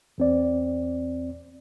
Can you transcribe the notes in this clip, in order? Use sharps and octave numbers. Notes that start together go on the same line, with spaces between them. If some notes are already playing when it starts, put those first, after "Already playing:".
E2 C4 D5